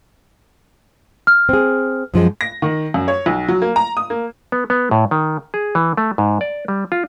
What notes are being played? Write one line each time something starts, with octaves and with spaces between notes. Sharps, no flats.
F6
C4 G#4
F#2 F3 G#3
A#6
D#3
F#2
C#5
B1
F#3
A#3
A#5
D#6
A#3
B3
B3
A2
D#3
G#4
E3
A3
G#2
D5
G3
F4